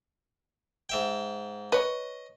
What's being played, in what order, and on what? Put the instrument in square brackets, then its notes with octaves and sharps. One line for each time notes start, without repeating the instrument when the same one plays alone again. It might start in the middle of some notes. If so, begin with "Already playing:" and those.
[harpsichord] G#2 E5 G5
[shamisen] B4 C#5 [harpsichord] D#5